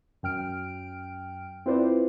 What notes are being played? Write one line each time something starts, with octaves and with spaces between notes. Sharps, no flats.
F#2 G5 F6 D7
C4 E4 F4 B4 C5 D5